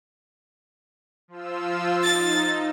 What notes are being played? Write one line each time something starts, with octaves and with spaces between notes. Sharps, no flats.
F3 F4 E6
D#4 A6